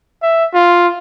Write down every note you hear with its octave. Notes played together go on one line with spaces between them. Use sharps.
E5
F4